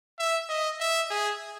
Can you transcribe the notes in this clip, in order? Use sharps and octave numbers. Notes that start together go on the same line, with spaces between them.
E5
D#5
E5
G#4